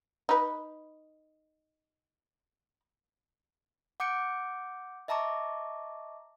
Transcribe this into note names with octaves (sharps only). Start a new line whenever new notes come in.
D#4 B4
F#5 D6 G6 C#7 D7
D#5 E5 A5 A#5 C#6 D6